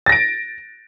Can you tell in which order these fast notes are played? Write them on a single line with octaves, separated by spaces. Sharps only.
A6 A#6 D7